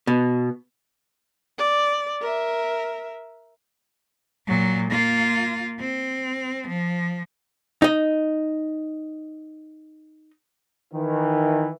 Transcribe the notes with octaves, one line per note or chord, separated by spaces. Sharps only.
B2
D5
A#4 E5
A#2 F#3
A#3 F4
C4
F3
D#4 D#5
D#3 E3